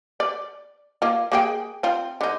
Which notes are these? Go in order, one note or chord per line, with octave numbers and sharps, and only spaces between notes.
D5
A#3 F4
A#3 G#4 G5
C4 F4
D3 D#4